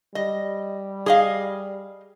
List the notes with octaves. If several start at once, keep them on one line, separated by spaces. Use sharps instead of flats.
G3 D#5
G#4 D#5 F5